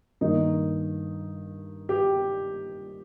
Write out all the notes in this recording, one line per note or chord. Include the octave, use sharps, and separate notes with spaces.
G2 D#3 A#3 D#4
G4